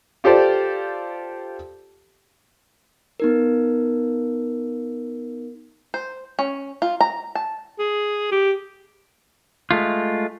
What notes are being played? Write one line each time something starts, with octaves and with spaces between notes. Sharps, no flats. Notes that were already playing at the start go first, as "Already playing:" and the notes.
F4 G4 A4 C5 D5
B3 D#4 A#4
C5
C#4
F4
A#5
A5
G#4
G4
G#3 A3 F4